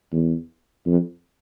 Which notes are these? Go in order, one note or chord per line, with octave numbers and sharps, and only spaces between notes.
E2
F2